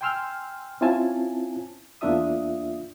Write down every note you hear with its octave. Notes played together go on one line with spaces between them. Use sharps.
G5 G#5 C6 E6 F6
C4 C#4 E4 F4 G#5 A5
E2 A#3 D4 F4 E5 D#6